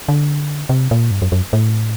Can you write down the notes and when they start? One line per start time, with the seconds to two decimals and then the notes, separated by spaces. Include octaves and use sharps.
0.08 D3
0.69 C3
0.91 A#2
1.11 G2
1.22 F#2
1.32 F#2
1.53 A2